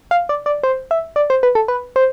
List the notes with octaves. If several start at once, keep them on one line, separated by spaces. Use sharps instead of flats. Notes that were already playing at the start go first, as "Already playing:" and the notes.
F5
D5
D5
C5
E5
D5
C5
B4
A4
B4
C5